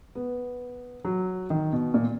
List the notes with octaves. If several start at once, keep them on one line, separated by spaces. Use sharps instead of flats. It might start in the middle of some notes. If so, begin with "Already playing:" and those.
B3
F#3
D#3
B2
A#2